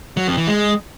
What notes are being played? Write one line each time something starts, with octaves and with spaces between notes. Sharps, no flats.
F#3
F2
E3
G#3